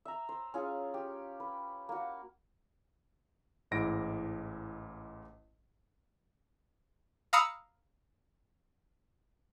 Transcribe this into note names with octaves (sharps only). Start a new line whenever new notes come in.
E5 A#5
C5
C#4 F4 G#4
G4
B4
A#3 F#4
A1 G#2 E4 A#6 D7
F5 A#5 B5 D#6 E6 C#7